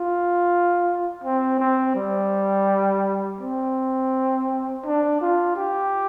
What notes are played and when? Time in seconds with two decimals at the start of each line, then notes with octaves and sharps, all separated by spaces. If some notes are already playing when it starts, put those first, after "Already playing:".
Already playing: F4
1.24 C4
1.59 C4
1.95 G3
3.41 C4
4.85 D4
5.21 F4
5.57 G4